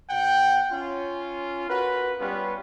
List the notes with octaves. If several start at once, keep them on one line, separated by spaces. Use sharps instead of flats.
B2 F#5 G5
C#4 F4
F#4 A#4 B4
G3 B3 C#4 F4 B4